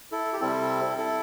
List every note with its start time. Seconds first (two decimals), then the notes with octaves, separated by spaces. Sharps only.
0.12 E4 A4
0.33 G4
0.41 C3 G3 C4 E4 A4
0.98 E4 A4